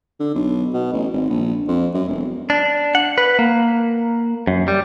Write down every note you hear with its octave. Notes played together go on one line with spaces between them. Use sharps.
D3
B1
B2
A1
G#1
A#1
F2
F#2
E1
D4
F#5
B4
A#3
F#2
G3